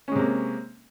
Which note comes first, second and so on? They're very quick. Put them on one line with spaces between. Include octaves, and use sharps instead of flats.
C#4 G#3 C3 A#3